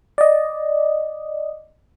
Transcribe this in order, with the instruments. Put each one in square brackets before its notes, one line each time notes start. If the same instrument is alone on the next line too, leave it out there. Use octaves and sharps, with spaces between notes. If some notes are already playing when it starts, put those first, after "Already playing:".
[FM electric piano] D5 D#5